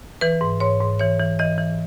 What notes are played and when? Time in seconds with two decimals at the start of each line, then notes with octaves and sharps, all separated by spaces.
0.21 E3 B4
0.41 G#2
0.60 G#2 C#5
0.81 G#2
0.99 E3 C#5
1.19 E3
1.39 E3 D#5
1.58 E3